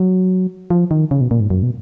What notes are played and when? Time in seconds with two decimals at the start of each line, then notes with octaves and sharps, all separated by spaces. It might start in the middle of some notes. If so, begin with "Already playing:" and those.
Already playing: F#3
0.70 F3
0.91 D#3
1.11 C#3
1.21 B2
1.31 A#2
1.40 G#2
1.50 F#2
1.63 B2